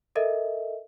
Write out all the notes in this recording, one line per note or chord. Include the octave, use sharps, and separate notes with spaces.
A4 A#4 D#5 E5